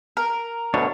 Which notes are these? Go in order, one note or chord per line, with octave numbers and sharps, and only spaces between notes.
A#4
D2 B2 D4 C#5